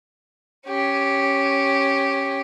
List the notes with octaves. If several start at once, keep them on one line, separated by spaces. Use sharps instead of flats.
C#4 G4